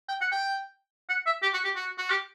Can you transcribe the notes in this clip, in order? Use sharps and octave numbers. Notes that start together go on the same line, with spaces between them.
G5
F#5
G5
F#5
E5
G4
F#4
G4
F#4
F#4
G4